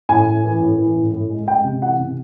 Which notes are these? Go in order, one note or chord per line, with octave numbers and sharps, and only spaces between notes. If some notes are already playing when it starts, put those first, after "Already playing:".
A2 G#5
A2
E3
A2
E3
A2
A2
G#3
G#3 G5
C3
E3 F#5
C3